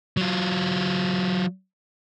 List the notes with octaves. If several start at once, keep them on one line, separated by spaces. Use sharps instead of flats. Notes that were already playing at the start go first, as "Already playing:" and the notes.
F#3 F4